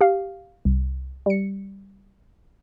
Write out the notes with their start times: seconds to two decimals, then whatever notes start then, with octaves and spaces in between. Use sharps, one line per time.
0.01 G4 F5
0.65 C2
1.26 G3 C#7